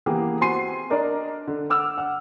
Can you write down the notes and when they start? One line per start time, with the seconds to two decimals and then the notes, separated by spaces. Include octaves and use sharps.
0.06 E3 A#3 B3 G4 G#4
0.41 C4 F#4 G#5 C6 C7 D#7
0.90 D4 A#4 D5 D#5
1.47 D3
1.70 F#5 D6 E6 F6
1.98 F#5